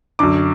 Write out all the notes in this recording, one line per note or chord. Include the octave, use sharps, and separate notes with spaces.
F#2 D3 D6